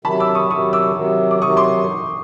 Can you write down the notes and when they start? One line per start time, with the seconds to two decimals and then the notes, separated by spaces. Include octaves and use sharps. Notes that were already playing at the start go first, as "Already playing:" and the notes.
0.05 C3 D#3 F#3 A5 B5
0.20 D6 E6
0.35 C#6 D#6
0.50 C3 D#3 F#3 C#6 D#6
0.73 D6 E6
0.96 C3 D#3 F#3
1.31 D6
1.41 C3 D#3 F#3 C#6 D#6
1.57 C6 D6